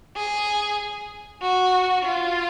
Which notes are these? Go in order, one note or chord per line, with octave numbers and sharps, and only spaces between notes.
G#4
F#4
F4